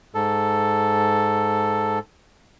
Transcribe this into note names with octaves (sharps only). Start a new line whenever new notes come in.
G#2 A4